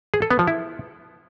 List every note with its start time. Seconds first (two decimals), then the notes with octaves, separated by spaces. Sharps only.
0.14 G#4
0.22 A4
0.31 B3
0.39 F3
0.47 E4